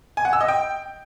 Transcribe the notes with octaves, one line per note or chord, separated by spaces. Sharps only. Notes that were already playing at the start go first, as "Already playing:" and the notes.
G#5
F#5
E6
D#5
G5